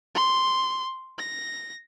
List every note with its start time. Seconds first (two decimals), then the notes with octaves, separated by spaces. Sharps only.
0.15 C6
1.18 A#6